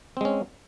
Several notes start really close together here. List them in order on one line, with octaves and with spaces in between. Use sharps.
C4 G#3 C#4